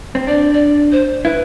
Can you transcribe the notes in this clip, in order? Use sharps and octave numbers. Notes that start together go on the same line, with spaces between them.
C4
D4 D5
D5
C5
E4 B4